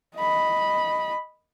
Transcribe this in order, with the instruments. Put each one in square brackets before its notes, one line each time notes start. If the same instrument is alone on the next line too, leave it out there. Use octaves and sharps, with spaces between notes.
[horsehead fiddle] D#5 B5